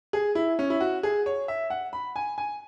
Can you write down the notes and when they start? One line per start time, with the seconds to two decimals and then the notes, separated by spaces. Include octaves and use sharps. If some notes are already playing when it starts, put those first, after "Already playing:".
0.13 G#4
0.35 E4
0.59 C#4
0.70 E4
0.80 F#4
1.03 G#4
1.26 C#5
1.48 E5
1.70 F#5
1.93 B5
2.16 G#5
2.38 G#5